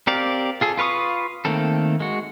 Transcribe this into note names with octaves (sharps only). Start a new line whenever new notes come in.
C4 G4 A#4 D5 F5
F4 G#4 A4
F4 B4 F5 C#6 D#6
D#3 A3 A#3 C4 A4
G#3 F#4